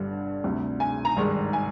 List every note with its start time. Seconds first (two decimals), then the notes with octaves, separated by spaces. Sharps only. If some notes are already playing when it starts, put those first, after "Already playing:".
Already playing: G1 G2 D3 G3
0.44 D2 C3 G3
0.80 G#5
1.05 A#5
1.16 G#1 G2 D#3 G#3
1.53 G#5